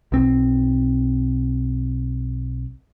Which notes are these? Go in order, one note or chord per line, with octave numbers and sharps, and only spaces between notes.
B1 C4